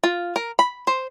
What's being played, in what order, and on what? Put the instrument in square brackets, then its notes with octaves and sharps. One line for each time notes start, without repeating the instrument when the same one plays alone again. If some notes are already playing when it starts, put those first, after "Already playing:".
[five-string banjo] F4
A#4
B5
C5